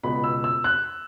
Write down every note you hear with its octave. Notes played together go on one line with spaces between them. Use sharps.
C#2 B2 B5
E6
E6
F#6